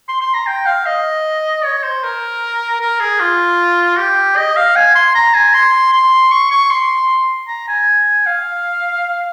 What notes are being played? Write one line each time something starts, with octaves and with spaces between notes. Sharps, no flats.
C6
C6
A#5
G5
F5
D#5
C#5
C5
A#4
A#4
G#4
F4
G4
D#5
F5
G#5
C6
A#5
G#5
C6
C6
C#6
C#6
C6
A#5
G#5
F5